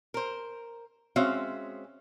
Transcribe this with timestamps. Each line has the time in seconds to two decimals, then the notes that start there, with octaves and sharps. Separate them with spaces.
0.14 A#4 C5
1.16 G#3 C4 C#4 F#4 E5 F5